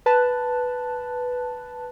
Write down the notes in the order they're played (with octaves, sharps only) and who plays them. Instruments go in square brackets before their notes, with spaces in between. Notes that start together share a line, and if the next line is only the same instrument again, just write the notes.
[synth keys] B4 A5 F#6